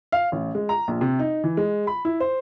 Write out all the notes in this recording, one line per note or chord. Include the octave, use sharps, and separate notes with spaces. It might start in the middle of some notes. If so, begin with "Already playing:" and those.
F5
A1
G#3
A#5
A#1
C3
D#4
E3
G#3
B5
E4
C5